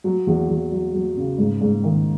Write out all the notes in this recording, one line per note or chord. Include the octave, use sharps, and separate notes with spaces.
F#3
E2
E2
F#3
F#3
C#3
G#2
G#2
D#3